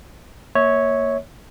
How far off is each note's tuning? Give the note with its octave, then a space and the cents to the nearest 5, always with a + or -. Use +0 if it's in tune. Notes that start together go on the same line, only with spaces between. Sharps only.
A#3 -10 C#5 +0 E5 -30